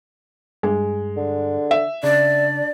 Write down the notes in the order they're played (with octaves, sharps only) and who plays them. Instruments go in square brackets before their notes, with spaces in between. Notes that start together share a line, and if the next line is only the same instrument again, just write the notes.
[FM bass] G2 [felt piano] G#3
[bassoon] D3
[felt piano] E5
[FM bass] C#3 [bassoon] D4 [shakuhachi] D5